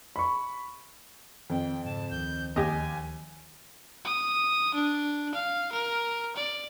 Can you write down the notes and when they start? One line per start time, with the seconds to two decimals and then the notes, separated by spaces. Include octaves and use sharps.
0.16 B5 C#6
1.50 F2 D#3 G5
1.85 G#2 C#3 A5
2.11 D2 D#3 F3 G6
2.56 D#2 G4 D#5 G#5
4.05 D#6
4.74 D4
5.35 F5
5.72 A#4
6.36 D5